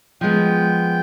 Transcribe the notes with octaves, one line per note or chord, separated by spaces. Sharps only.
F3 G#3 B3 G5